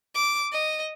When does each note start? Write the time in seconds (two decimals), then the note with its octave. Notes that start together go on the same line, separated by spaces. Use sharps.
0.15 D6
0.52 D#5